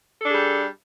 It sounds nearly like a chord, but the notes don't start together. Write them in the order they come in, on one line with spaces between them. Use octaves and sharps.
A4 D4 G#4 G3